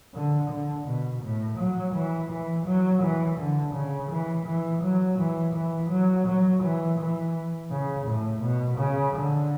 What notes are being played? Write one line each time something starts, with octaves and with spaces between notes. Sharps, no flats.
D3
D3
B2
A2
F#3
E3
E3
F#3
E3
D3
C#3
E3
E3
F#3
E3
E3
F#3
F#3
E3
E3
C#3
A2
B2
C#3
D3